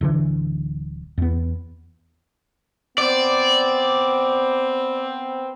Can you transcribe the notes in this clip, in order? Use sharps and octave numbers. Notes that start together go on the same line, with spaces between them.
D1 D3 E3
E2 B3
B3 C4 D5